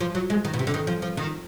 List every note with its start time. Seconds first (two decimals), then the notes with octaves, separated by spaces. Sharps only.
0.01 F3
0.15 F#3
0.30 G#3
0.45 D#3
0.53 B2
0.59 C3
0.67 D3
0.74 D#3
0.87 F3
1.02 F3
1.17 D#3